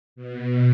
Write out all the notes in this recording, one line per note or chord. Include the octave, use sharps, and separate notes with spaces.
B2